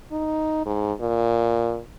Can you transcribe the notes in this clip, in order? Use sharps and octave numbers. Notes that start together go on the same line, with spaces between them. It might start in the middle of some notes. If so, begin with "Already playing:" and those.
D#4
G#2
A#2